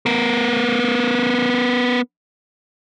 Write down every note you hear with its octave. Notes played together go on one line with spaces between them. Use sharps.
B3 A#4